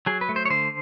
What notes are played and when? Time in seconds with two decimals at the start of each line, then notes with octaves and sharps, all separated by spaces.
0.06 F#3 G#4
0.21 B4
0.29 A3
0.36 C5
0.45 C#5
0.50 D3 C5